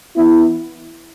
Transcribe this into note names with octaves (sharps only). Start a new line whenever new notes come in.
E3 B3 E4